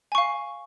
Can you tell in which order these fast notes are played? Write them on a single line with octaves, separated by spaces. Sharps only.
G#5 C#6 F5